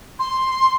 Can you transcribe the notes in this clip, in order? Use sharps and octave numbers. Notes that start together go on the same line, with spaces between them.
C6